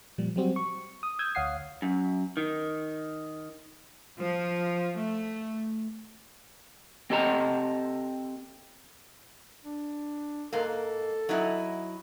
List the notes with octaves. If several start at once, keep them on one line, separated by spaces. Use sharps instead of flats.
A#2 F3 G3
F#3 G3 C4 F#4
C#6
D#6
D#6 E6 G6 G#6
D2 C#5 F5 F#5 D#6 C7
F#2
D#3
F3
A3
C4 G4 A4 D#5 A5 A#5
D4
G#2 A#3 A4
F#3 D#4 E4